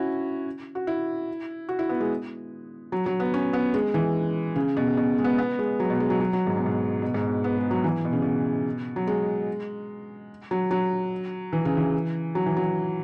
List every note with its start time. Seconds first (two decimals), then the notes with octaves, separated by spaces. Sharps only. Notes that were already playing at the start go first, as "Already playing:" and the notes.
Already playing: C#4 E4 F#4
0.75 F#4
0.87 E4
1.69 F#4
1.79 E4
1.89 B3
2.00 G#3
2.92 F#3
3.06 F#3
3.20 B3
3.34 C#4
3.53 B3
3.74 G#3
3.94 E3
4.56 C#3
4.77 B2
4.97 B2
5.18 G#3
5.24 B3
5.38 B3
5.59 G#3
5.80 F#3
5.90 B2
6.00 G#3
6.10 F#3
6.20 F#3
6.33 F#3
6.47 G#2
6.57 B2
6.66 G#2
7.02 B2
7.14 G#2
7.26 B2
7.44 B3
7.57 G#3
7.71 F#3
7.84 E3
8.04 B2
8.13 C#3
8.22 B2
8.96 F#3
9.07 G#3
10.51 F#3
10.71 F#3
11.53 E3
11.65 C#3
11.77 E3
12.35 F#3
12.46 E3
12.57 F#3